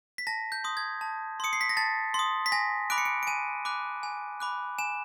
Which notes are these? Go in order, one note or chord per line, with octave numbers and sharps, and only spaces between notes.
B6
A5 A#6
G6
C6 D#6
G#6
A5
C6 D#6 C#7
C7
B6
A#6
A5 A6
C6 D#6
B6
G#5 A#6
B5 D6 F#6 D7
C#7
D7
D7
G#5 D#7
B5 D6 F#6
G#5
B5 D6 F#6
G#5 E7